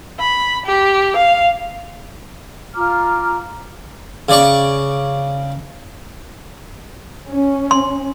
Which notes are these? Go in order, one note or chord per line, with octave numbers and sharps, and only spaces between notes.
B5
G4
F5
F4 A#5 D6 F6
C#3 D5 C#6
C#4
C6